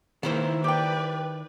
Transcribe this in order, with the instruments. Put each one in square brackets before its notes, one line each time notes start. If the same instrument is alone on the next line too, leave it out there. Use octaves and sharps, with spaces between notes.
[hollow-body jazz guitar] D#3 E4 C5 [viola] E3 A#3
[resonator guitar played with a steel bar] G4 G5 [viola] B4 D5